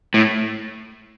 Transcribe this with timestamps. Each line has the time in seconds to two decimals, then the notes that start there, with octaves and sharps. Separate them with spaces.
0.14 A2